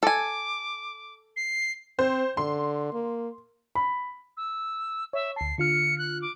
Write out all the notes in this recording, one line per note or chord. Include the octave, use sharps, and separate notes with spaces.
A4 G#5 D6
C7
C4 C5
D3 C6
A#3
B5
E6
C#5 E5
D2 A5 C7
D3 F4 F6 C#7
F#6
D6